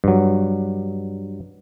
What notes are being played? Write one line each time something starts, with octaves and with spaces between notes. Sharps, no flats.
G2 F#3